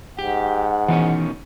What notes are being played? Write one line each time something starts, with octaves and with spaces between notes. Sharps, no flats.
G#2 G4 F#5
B2 D#3 E3 C#4